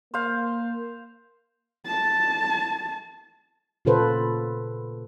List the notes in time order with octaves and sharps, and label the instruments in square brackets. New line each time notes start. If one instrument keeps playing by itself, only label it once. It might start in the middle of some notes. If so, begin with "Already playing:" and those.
[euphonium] A#3 [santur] C5 F5
[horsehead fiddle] A5
[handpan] A#2 C#3 F4 A4 B4 C5